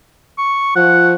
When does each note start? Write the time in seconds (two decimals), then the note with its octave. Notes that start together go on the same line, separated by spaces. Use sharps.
0.38 C#6
0.76 F3 F#5